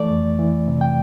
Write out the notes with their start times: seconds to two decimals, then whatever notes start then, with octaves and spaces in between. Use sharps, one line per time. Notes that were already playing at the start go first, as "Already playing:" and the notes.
Already playing: E3 A3 D5
0.11 F2
0.39 E3
0.68 C3
0.81 G5